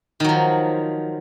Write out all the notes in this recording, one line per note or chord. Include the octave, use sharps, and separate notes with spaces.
D#3 F3 F#3